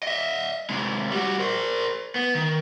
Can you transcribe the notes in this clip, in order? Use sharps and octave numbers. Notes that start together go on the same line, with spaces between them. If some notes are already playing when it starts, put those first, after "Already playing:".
D#5 E5
C3 G#3
G3 F#4
A#4 C5
B3
D#3